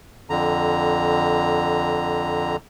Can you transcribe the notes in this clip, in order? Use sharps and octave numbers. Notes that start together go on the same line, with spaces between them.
F2 D3 A#5